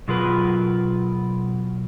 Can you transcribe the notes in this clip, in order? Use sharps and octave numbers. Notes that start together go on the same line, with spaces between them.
B2 F#3 F4 G#4 A#4 B4